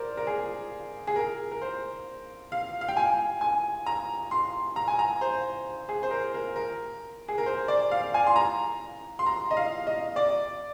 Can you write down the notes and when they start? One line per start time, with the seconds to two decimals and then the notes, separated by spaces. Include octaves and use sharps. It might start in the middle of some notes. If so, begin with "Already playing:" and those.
Already playing: A#4 C5 D5
0.17 A#4
0.27 G#4
1.07 G#4
1.16 A#4
1.52 A#4
1.62 C5
2.52 F5
2.81 F5
2.88 G5
2.97 G#5
3.41 G#5
3.86 A#5
4.31 C6
4.76 A#5
4.88 G#5
4.99 A#5
5.21 C5
5.89 G#4
6.03 C5
6.11 A#4
6.34 A#4
6.56 A#4
7.28 G#4
7.38 A#4
7.46 C5
7.68 D5
7.91 F5
8.14 G#5
8.27 C6
8.36 A#5
9.19 C6
9.26 A#5
9.51 D#5
9.57 F5
9.87 D#5
10.16 D5